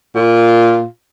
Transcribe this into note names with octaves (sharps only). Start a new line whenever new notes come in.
A#2 F4